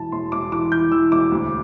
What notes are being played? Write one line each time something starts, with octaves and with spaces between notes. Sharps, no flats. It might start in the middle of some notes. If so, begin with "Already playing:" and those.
Already playing: E1 E3 A5
E1 C6
E1 D6
E3 D6
E3 G6
E3 E6
E1 D6
D2